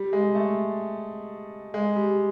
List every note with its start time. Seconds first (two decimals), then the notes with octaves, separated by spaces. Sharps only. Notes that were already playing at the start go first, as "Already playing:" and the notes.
Already playing: G3
0.13 G#3
0.35 A3
1.74 G#3
1.96 G3